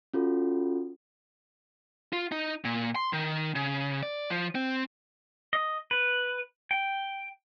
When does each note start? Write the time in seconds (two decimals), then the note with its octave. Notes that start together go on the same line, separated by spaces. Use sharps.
0.14 C#4 F4 F#4 A4
2.13 F4
2.32 D#4
2.65 A#2
2.95 C6
3.13 D#3
3.55 C#3
4.03 D5
4.30 F3
4.55 C4
5.53 D#5
5.91 B4
6.71 G5